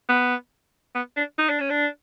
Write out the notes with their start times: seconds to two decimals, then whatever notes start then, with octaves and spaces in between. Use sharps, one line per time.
0.09 B3
0.95 B3
1.16 D4
1.38 D#4
1.49 D4
1.60 C#4
1.70 D4